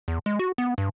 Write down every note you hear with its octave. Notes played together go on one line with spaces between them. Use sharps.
E2
G#3
F#4
B3
G2